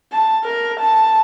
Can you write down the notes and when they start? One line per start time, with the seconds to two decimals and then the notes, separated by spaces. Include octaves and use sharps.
0.12 A5
0.44 A#4
0.80 A5